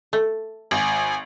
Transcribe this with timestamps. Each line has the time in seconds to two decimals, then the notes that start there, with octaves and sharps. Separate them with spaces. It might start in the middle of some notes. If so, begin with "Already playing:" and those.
0.13 A3
0.71 G#1 G#5